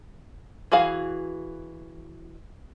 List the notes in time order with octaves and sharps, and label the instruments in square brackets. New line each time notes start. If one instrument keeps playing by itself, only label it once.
[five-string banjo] E3 F#4 G#4 F5